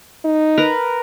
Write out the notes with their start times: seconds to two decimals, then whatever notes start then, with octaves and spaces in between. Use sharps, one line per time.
0.25 D#4
0.57 A#4 B4 A#5